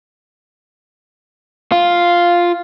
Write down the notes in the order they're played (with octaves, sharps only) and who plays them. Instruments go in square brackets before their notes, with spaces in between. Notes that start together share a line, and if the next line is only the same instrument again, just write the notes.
[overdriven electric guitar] F4